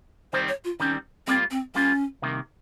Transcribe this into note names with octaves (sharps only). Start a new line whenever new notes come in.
D#3 G3 C4 C5
C#5
F4
D#3 G3 C4 C#4
G3 A#3 C4 F4
C4
G3 A#3 C#4 F4
C2 C3 D#3 A#3